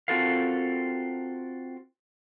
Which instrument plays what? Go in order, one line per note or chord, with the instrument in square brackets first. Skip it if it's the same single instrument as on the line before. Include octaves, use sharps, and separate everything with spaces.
[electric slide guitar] C4 F4 F#4 A4 A#4 F5